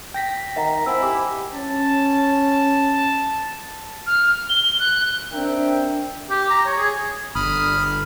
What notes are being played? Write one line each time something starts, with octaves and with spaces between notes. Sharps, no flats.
G5 A#6 B6
D#3 D#5 F#5 A#5
C4 E4 F#5 G#5 E6
G4 D6
C#4 A5
F6
G7
F#6
C4 D4 A#4 E5 G5
G4
A#5
C#5
G#4
G1 B5 D#6 F6